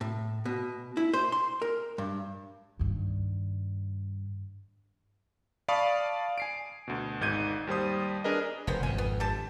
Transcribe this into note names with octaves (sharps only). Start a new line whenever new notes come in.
A2
B2
E4
C5
C6
A#4
G2
G2 D#3
D5 F5 A5 B5 C#6 D#6
G#5 C7 D7
D2 B2
G#1 G#2 G6 G#6 D#7
D#2 G3 C5 D#6
D4 G#4 A#4 B4 D#5
F1 A#3 B3 C5
G#1 F2 G#5
B3
D3 G4 A5